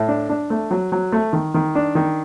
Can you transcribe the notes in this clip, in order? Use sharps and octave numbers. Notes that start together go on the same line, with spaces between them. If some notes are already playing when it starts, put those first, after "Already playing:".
Already playing: A2
D4
D4
A3
F#3
F#3
A3
D#3
D#3
D4
D#3